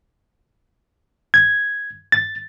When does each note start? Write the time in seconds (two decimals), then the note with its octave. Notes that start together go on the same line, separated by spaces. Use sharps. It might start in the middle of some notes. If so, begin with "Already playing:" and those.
1.34 G#6
2.12 A6